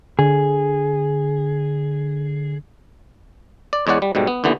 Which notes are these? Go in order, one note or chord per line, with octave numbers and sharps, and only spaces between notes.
D3 G#4
D5
E2 G#3 C#5 D5 F#5
G3
G#2 B2 G3 A3
B3
D#2 D3 E3 B3